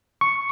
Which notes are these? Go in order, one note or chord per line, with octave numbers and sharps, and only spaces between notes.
C#6